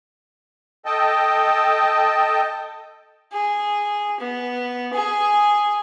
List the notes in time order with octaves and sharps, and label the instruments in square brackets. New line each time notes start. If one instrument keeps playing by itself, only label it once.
[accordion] A4 D#5 G5 A5
[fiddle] G#4
B3
G#4